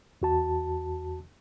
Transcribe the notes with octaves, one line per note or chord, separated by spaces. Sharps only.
E2 F#4 A5